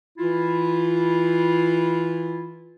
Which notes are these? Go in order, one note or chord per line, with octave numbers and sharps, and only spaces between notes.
E3 E4 F4